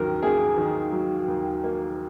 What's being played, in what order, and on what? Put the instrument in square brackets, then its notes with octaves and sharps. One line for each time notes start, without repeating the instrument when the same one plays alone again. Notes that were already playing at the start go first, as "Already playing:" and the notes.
Already playing: [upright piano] D#2 D#3 F#3 [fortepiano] A#4
[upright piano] A#3 [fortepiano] G#4
[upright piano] D#3
F#3
D#2
A#3